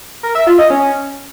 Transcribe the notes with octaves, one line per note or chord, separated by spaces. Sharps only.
A#4
E5
F4
D#5
C#4